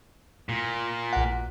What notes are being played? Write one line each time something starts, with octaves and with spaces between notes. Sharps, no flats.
A#2
A#1 F#5